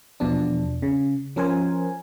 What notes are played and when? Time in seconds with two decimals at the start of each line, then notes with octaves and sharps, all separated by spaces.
0.20 E2 B2 F3 D4
0.82 C#3
1.36 F3 C#4 A#4 C5 G#5